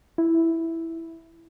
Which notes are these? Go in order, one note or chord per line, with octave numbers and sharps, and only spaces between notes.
E4